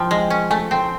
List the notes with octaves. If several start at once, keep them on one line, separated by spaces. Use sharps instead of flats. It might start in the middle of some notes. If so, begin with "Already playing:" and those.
Already playing: F3 G5
G#3
C#4
A3 G#5
C4 G5